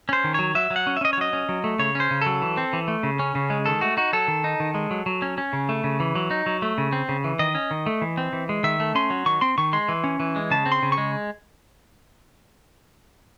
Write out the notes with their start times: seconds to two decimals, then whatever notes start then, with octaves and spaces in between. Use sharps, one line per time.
0.09 C#4 C5
0.24 D#3
0.34 F#3 C#5
0.55 F#3 E5
0.70 F#3
0.76 F#5
0.87 C#4
0.97 E5
1.01 C#4 D#5
1.13 C#5
1.18 F#3 D#5
1.33 C#4
1.49 F#3
1.64 A3
1.79 C#3 C#5
1.95 C#4 C5
2.11 C#3
2.22 F#3 A4
2.42 E3
2.57 C4
2.73 E3
2.88 A3
3.03 C#3
3.19 C#4
3.35 C#3
3.50 G#3
3.66 D#3 A4
3.81 A3 F#4
3.97 D#4 F#4
4.13 F#3 A4
4.28 D#3
4.44 D#4
4.60 D#3
4.74 G#3
4.91 F#3
5.06 F#3
5.22 C#4
5.38 C#4
5.53 C#3
5.69 A3
5.84 C#3
6.00 E3
6.15 F#3
6.31 D#4
6.46 F#3
6.62 A3
6.78 C#3
6.92 C4
7.09 C#3
7.24 E3
7.39 D#3 D#5
7.55 C#4
7.71 D#3
7.86 A3
8.02 E3
8.17 C4
8.33 E3
8.49 G#3
8.63 D#3 E5
8.80 A3
8.95 C#4 C6
9.10 F#3
9.26 D#3 C#6
9.41 C4 C6
9.58 D#3 C#6
9.73 G#3 C6
9.89 E3
10.04 C#4
10.20 E3
10.36 G#3
10.51 C#3 A5
10.66 C4
10.72 C6
10.83 C#3
10.92 C#6
10.98 G#3